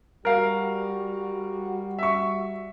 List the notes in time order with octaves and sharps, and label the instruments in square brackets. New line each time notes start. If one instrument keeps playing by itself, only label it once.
[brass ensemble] G3 F#4 [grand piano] A#4 F5
[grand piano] E5 C#6